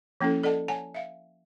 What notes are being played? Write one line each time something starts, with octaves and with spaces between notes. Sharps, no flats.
F3 A#3 C#4 E4 A4
A4 D5 D#5 F#5 A5
C#5 F#5 G#5 A5
E5 F5